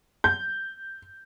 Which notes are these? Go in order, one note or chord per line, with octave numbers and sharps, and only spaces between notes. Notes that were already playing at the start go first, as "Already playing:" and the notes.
G6